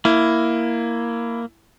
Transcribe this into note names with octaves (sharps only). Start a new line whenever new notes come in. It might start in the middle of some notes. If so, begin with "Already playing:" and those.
A#3 E4